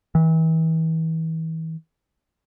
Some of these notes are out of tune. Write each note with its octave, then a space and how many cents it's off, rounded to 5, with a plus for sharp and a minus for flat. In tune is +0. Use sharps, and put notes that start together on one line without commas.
E3 -35